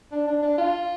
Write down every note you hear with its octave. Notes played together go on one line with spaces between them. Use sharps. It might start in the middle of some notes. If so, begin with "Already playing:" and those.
D4
D4
D4
F4